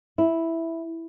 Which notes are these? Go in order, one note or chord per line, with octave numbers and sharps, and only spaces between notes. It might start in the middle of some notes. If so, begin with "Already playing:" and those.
E4